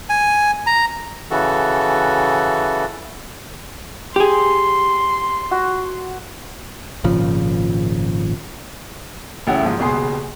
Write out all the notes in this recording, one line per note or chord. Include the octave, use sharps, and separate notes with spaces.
G#5
A#5
C#3 E3 F#4 A4
G4 G#4 C6
F#4
G#1 A#2 C#3 F3
A1 C#3 E4 F#5
D#2 G#2 F3
D#1 C#2 B2 G#4 C6